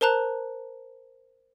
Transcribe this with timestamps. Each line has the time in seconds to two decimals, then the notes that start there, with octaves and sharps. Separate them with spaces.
0.01 A#4 C5 A5 A#5 F#6